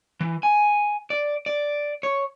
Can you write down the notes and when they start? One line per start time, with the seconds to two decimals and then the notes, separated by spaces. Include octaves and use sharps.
0.20 E3
0.43 G#5
1.10 D5
1.46 D5
2.03 C#5